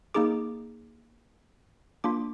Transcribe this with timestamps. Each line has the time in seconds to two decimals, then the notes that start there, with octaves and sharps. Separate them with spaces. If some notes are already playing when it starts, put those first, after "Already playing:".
0.14 A#3 D#4 G#4 D6
2.04 A#3 D4 F4 D6